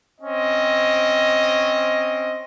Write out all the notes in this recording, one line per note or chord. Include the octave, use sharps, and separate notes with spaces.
C4 C#4 D#5